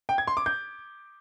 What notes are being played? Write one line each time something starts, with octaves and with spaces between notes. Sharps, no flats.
G5
G#6
C6
D6
G6